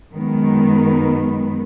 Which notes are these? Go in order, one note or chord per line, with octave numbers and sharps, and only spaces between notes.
F#2 D#3 G#3 B3